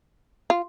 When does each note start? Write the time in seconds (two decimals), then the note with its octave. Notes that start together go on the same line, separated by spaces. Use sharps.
0.50 F4